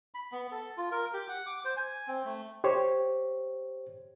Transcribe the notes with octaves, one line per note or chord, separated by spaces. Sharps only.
B5
B3
A4
F4
A#4
G4
F#5
D6
C5
G#5
C4
A3
G4 C5 C#5